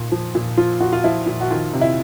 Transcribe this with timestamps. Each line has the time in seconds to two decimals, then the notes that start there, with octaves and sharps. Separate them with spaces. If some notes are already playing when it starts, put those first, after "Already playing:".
Already playing: A#2
0.12 F3
0.35 A#2
0.58 F3 F4
0.80 A#2 F#4
0.93 F4
1.04 F3 E4
1.26 A#2
1.41 F#4
1.51 D#3 F4
1.73 C3
1.81 E4